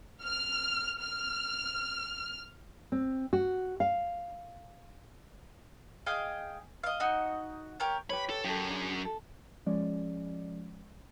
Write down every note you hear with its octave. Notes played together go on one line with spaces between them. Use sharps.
F6
F6
C4
F#4
F5
G#4 D#5 F5 G5
D#5 F5
D#4 F#4 D#5
G4 A#4 C#5
G4 B4 C#5 B5
A4
F#2 G4 A4
D4 G#4
A4
F3 G#3 C#4 D5